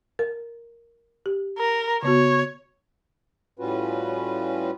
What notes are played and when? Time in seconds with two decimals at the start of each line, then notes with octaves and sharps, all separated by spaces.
0.19 A#4
1.26 G4
1.58 A#4
2.03 C#3 B3 F#4 C#5
3.59 A2 G3 C#4 F4 F#4 B4